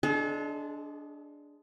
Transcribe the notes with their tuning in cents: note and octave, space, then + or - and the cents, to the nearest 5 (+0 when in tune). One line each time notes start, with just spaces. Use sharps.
G#3 +0 D4 -5 A4 -45